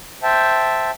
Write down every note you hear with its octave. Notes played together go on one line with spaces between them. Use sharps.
C5 E5 G5 A5